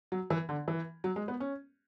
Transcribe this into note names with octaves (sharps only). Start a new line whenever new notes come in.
F#3
E3
D3
E3
F#3
G#3
B3
C#4